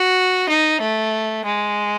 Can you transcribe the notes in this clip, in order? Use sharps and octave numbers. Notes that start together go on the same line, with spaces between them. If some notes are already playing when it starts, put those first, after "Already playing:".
Already playing: F#4
D#4
A3
G#3